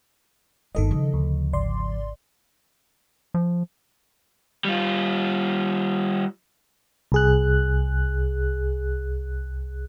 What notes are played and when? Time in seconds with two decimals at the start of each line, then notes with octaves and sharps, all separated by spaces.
0.75 G1 D#2 D#3 A4 D#5
0.91 C#3 F3
1.13 D2
1.53 G#1 D5 C6
3.34 F3
4.65 G3 F4
7.12 C2 G#4 F#6